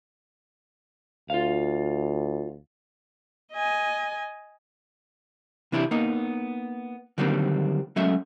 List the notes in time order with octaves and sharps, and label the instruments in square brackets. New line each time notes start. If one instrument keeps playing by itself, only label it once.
[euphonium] D2 [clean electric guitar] F4 F5
[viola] D#5 G#5
[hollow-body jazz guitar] C3 E3 D4 E4 F4 G4
A#3 B3 D#4
D3 D#3 F#3 G3 A#3 C4
F#3 G#3 A3 C#4 E5